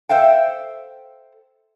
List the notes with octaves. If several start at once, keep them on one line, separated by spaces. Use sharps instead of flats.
A4 C5 E5 F5 G5